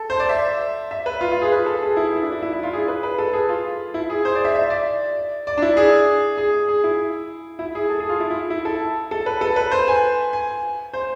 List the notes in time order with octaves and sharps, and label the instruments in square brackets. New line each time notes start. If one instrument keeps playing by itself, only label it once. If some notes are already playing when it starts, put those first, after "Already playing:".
Already playing: [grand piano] A4
C5
D5
E5
E5
B4
F4
F4
G#4
B4
A4
G#4
E4
E4
D4
E4
E4
E4
F4
G#4
B4
B4
A4
G#4
F4
E4
G#4
C5
D5
E5
E5
D5
D5
D4
E4
G#4
G#4
G#4
E4
E4
G#4
A4
G#4
F4
E4
E4
E4
A4
A4
B4
A4
B4
C5
G#5
G#5
C5